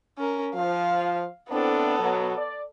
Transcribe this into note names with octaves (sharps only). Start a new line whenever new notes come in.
C#4 A#4
F3 F5
A2 B3 C4 D4 A4
B2 F#3
D5